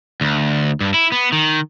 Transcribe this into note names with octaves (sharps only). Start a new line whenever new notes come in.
D2
G2
E4
B3
D#3